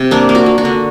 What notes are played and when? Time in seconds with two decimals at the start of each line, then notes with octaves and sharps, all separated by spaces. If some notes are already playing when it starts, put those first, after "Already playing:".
Already playing: C3
0.11 A#3 D4
0.29 A#3
0.35 F#4
0.46 A#3
0.58 F#4
0.65 D3